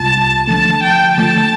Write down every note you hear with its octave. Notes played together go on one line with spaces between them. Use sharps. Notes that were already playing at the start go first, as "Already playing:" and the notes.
Already playing: C2 C3 G3 F4 A5
D3 F3 A3 A5
G5
D3 F3 A3 A5